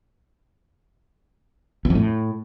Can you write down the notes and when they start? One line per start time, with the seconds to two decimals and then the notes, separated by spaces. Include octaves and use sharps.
1.85 E2
1.90 F2
1.95 A2